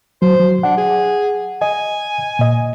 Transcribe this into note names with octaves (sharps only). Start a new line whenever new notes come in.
F#3 C5
F#3
D4 F#5
G#4
D#5 G#5
A#2 D#5